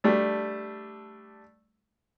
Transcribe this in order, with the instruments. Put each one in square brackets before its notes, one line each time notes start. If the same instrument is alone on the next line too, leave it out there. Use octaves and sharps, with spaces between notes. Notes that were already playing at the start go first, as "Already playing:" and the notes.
[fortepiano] G3 A3 D4